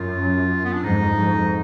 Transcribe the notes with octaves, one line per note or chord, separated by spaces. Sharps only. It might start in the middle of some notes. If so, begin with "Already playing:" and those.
Already playing: F#2 F4
B3
D4
F2 G#2 D#4
F2 G#2